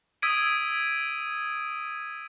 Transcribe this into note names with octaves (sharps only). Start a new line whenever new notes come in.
D#6 E6 G#6 B6 D7 D#7